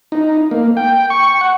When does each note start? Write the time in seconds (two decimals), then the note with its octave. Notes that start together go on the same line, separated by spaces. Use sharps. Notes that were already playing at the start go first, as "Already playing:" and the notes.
0.12 D#4
0.51 A#3
0.77 G5
1.10 C#6
1.41 F#5